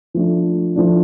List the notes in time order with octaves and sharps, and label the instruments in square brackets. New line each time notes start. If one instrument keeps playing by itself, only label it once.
[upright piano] F3 A3 D4
F3 A3 D4